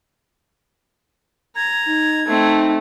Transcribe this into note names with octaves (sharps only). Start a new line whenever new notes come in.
A#5 G#6
D#4
A3 C4 D#4